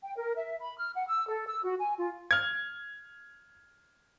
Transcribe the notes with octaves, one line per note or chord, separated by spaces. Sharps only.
G5
A#4
E5
B5
F6
F#5
E6
A4
E6
F#4
G#5
F4
F6 G#6